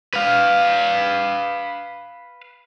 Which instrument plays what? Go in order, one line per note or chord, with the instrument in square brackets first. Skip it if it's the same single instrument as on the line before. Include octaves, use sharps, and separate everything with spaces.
[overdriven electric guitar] B4 F5